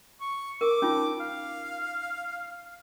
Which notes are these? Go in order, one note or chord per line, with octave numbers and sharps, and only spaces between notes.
C#6
A#4 D6
C#4 D#4 F4
F5